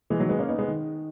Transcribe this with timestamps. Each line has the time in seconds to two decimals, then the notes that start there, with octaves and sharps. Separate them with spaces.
0.10 E3 G#3
0.20 D#3 F#3
0.29 G#3 B3
0.39 A#3 C#4
0.48 B3 D#4
0.59 G#3 B3
0.68 D#3